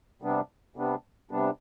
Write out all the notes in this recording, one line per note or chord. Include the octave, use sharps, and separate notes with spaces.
C3 G3 B3 D4
C3 G3 B3 D4
C3 G3 B3 D4